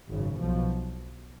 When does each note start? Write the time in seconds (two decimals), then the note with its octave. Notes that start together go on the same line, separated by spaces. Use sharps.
0.10 G#1 F#2 C#3
0.38 B1 B2 F3